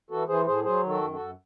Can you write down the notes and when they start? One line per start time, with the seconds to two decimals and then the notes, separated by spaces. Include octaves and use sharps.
0.10 E3 F#4 A4
0.28 E3 G#4 C5
0.47 A2 G#4 C5
0.65 F#3 G#4 C5
0.84 D#3
0.89 F#4 A4
1.01 F#2
1.13 F#4 A4
1.19 F#2